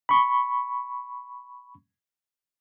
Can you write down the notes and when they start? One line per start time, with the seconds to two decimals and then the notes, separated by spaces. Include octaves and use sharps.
0.09 B5 C#6